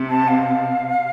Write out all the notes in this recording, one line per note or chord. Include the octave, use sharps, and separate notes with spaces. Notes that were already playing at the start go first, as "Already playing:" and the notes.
Already playing: C3
A5
F5